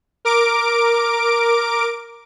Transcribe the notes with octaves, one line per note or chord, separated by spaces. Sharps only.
A#4 D6 D7